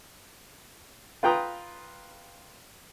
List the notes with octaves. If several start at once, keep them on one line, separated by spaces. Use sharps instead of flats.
F4 B4 G5 A#5 D#6